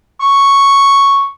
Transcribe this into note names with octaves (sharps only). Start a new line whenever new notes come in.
C#6